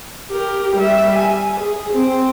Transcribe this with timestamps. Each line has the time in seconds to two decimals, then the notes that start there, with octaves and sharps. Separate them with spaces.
0.31 G4 A#4
0.76 G3 E5
1.16 G#5
1.60 G#4
1.93 C4